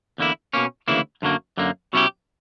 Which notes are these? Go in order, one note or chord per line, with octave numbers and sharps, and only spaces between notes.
E2 D3 A#3 E4
B2 A#3 C#4
D2 C#3 E3 A#3 E4
F#2 D3 F#3 A#3
F#2 D3 A#3
B2 F#3 C#4 E4 G4